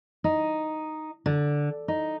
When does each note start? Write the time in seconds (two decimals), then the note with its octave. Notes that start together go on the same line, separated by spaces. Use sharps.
0.24 D#4
1.26 D3
1.88 D#4